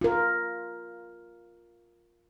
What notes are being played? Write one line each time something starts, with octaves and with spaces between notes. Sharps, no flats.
F4 A#4